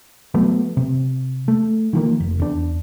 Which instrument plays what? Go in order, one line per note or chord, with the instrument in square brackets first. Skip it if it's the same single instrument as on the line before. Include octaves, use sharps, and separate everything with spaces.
[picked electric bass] F3 F#3 A3 B3
C3
A3
D#3 F3 A#3
F1
E2 D4